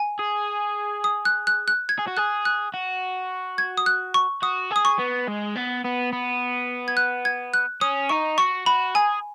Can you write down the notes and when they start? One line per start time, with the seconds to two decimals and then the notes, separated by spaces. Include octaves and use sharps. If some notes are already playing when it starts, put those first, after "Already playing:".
Already playing: G#5
0.19 G#4
1.04 D#6
1.25 F#6
1.47 F#6
1.68 F#6
1.89 G#6
1.99 G#4
2.07 F#4
2.17 G#4 F#6
2.45 F#6
2.74 F#4
3.58 G#6
3.77 D#6
3.86 F#6
4.14 C#6
4.42 F#4 D#6
4.71 G#4 D#6
4.85 C#6
4.99 B3
5.28 G#3
5.56 B3
5.84 B3
6.13 B3
6.88 G#6
6.97 F#6
7.25 G#6
7.54 F#6
7.81 C#4 D#6
8.09 D#4 C#6
8.38 F#4 C#6
8.66 F#4 B5
8.95 G#4 G#5